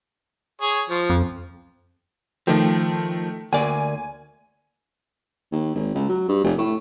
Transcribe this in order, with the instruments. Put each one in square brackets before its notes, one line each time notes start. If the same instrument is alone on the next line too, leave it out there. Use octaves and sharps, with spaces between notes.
[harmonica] G#4 C#5
F3
[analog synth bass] F2
[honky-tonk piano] D#3 A3 G5 [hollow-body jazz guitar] F3
[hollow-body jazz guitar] D2 A#3 D5 [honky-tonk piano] G#5
[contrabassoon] D#2
G#1
C#2
F#3
G2
F1
A2